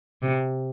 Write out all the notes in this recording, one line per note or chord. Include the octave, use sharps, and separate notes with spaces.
C3